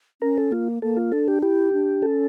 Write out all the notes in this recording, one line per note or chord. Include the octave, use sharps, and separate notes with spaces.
C#4 A#4
A4
A#3 F4
A#3 A4
F4
D4 A4
G4
E4 G4
D4
C#4 A4